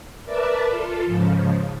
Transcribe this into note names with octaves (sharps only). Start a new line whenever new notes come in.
A#4 B4 D5 E5 A5 D6
F4 A4
G#2 C#3 F3